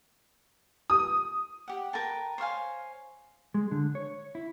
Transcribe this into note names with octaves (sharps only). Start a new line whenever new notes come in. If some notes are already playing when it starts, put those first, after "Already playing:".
D#6
G4 F#5
A#4 B4 G5 A5
C5 C#5 F5 G#5
G#3
D3
C#5
E4